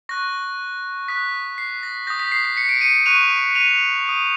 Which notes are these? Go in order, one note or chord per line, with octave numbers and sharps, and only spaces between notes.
C#6 F#6 A#6
D#6 F#6 B6
C7
A#6
D#6 G6 A#6
B6
C7
C7
B6 C#7
C7 D7
C#7 D#7
C#6 F#6 D#7 F7
D#7 F7
D#6 G6